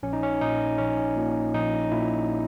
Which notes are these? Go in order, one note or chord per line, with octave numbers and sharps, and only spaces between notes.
A#1 C#4
D#4
C#4
A#2 D#4
A#1 C#4
A#2
A#1 D#4
A#2 E4